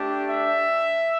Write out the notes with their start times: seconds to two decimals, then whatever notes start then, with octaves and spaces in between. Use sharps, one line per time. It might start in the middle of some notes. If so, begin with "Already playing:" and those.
Already playing: A3 D4 G4
0.28 E5